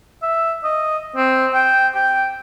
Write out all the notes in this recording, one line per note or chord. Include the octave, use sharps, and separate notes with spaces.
E5
D#5
C4
G5
G5